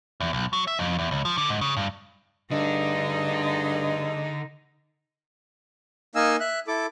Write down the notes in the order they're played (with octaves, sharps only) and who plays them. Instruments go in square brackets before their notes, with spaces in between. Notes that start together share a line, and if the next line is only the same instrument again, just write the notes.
[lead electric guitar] E2
B1
F#3
E5
F2
E2
C#2
F3
D3
G#2
C#3
G2
[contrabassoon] G2 [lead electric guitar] D3 [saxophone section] A3 G#4 D#5 [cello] D#4
[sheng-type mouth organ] A#3 D#4 D#5 F5 G#5 E6
E5 F#6
E4 A4 D6